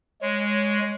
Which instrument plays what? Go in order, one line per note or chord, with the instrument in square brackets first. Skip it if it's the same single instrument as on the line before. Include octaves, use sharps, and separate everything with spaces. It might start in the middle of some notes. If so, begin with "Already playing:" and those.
[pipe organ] G#3 [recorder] C#5